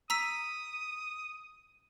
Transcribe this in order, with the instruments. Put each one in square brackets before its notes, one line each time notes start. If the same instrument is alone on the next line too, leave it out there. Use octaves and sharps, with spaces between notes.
[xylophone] A#5 E6 B6 [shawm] D#6